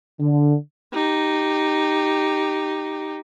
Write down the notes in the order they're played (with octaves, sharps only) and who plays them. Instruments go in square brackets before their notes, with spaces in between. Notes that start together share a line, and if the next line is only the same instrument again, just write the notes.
[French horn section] D3
[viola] D#4 G4